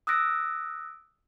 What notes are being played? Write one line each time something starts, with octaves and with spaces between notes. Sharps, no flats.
D#6 E6 F#6 A#6 D7